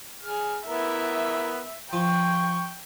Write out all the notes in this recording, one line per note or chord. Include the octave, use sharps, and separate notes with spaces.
G#4 F6
B3 E4 A#4 E5
F3 G5 C#6